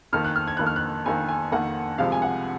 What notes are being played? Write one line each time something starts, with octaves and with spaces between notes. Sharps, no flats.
F2 D#3 A#3 F6
F#6
F6
G#6
F2 D#3 A#3 F#6
F6
F#6
F2 D#3 A#3 G#5
G#5
F2 D#3 A#3 F#5
C2 C3 F3 G#3 F5
G#5
F#5